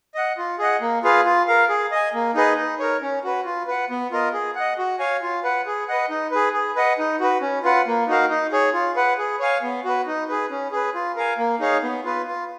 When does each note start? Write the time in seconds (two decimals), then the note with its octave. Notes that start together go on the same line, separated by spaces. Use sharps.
0.15 D#5 F#5
0.38 F4
0.59 G#4 D#5 F#5
0.81 A#3
1.03 F4 G#4 B4 F5
1.25 F4
1.47 A#4 F5
1.69 G#4
1.92 D#5 G#5
2.14 A#3
2.35 D#4 G#4 B4 D#5
2.57 D#4
2.79 A#4 C#5
3.01 C#4
3.24 F#4 B4
3.45 F4
3.67 B4 F#5
3.90 B3
4.11 F4 A#4 D#5
4.33 G#4
4.55 D#5 F#5
4.78 F#4
4.99 C#5 F5 G#5
5.22 F4
5.44 B4 F#5
5.66 G#4
5.88 B4 D#5 F#5
6.10 D#4
6.31 G#4 B4
6.54 G#4
6.76 B4 D#5 F#5
6.98 D#4
7.20 F#4 B4
7.41 C#4
7.63 F4 B4 F#5
7.87 A#3
8.08 D#4 F#4 A#4 F5
8.29 D#4
8.52 G#4 C#5
8.73 F4
8.96 B4 F#5
9.18 G#4
9.39 C#5 F5 G#5
9.62 B3
9.84 F#4 B4
10.06 D#4
10.28 G#4 B4
10.50 C#4
10.72 G#4 B4
10.94 F4
11.16 A#4 F5 G#5
11.38 A#3
11.60 D#4 G#4 C#5 F5
11.82 B3
12.04 F4 B4
12.27 F4